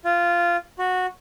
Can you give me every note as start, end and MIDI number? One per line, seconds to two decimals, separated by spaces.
0.05 0.57 65
0.79 1.06 66